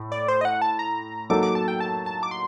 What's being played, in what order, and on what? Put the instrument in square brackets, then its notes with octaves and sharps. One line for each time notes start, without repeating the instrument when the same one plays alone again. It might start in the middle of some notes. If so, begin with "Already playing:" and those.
Already playing: [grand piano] A2
[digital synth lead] D5
C5
D#5
F#5
A5
A#5
[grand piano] F#3 A#3 D#4 A4 [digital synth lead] D6
[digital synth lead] D6
A5
G5
A5
A5
D6
C6